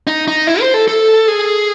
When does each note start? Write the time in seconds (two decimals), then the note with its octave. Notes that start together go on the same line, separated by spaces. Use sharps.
0.07 D#4
0.28 D#4
0.47 E4
0.61 C5
0.74 A4
0.88 A4
1.28 G#4